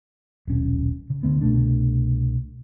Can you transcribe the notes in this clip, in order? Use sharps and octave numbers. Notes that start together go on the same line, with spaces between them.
D#1 B1 C#4
C#3
D2 D3 G#3 B3
C2 B2 A3 D4